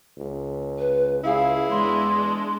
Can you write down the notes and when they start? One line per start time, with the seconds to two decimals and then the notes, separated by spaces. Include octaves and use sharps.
0.18 C#2
0.78 B4
1.24 C#2 E4 G#4 F5
1.70 E2 G#3 D4 C6